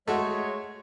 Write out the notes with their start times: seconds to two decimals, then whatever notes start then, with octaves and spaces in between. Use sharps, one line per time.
0.08 G#3 A3 F#4 C#5